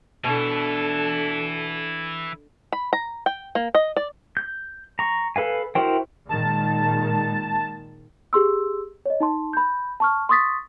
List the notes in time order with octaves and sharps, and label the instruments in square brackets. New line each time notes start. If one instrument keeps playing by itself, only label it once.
[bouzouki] B2 [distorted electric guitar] E3 E4 [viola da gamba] D4 A4
[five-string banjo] B5
A#5
G5
A#3
D#5
D5
[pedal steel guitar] G6
A#5 C#6
A4 B4 F5 G#5
E4 F#4 A#4 C5 G5
[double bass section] A#2 D#3 G#3 [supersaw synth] A5
[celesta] G4 G#4 C6 E6
C#5 D#5
D#4 A5 C6
B5 G6
A5 C#6 F6
C6 C#6 D#6 A6 B6